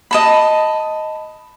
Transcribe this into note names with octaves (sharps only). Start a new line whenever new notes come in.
D#5 A5 B5